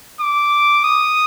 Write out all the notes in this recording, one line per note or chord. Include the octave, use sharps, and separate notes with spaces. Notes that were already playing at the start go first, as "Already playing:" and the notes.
D6
D#6